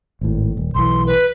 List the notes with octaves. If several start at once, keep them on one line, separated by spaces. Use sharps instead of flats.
G#1 A2
D#1
B1 E3 C6
B4